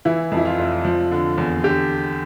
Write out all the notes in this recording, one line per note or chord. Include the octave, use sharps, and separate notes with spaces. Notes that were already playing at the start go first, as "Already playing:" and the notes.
E3 E4
F2
E4
F4
F1
F3
D3
E2
D3 G4